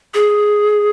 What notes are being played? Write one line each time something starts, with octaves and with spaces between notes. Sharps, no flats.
G#4